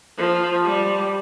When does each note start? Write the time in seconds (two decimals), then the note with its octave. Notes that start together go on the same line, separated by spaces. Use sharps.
0.17 F3
0.64 G3